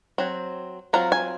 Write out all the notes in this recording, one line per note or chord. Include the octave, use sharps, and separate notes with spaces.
F#3 C4
F#3 C4 F4 A#5
G#5